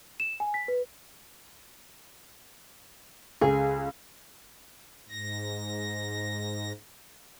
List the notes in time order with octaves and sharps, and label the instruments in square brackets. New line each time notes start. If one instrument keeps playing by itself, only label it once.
[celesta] E7
G#5
B6
B4
[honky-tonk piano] C#2 [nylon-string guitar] G#4
[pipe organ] G#2 A#6